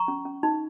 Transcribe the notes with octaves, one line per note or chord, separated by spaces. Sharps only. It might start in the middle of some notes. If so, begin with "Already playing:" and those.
Already playing: A#5 C#6
C#4
C#4
D#4